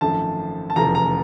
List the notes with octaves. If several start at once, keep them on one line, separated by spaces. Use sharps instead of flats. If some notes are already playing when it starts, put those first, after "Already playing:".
G#1 F#2 D3 F3 A3 A5
A5
F1 E2 C#3 F3 A3 A#5
A#5